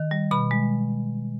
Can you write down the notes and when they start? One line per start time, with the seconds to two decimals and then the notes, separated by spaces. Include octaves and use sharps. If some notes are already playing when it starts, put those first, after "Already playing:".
Already playing: D#3
0.11 G3
0.31 B2 B5
0.51 G#3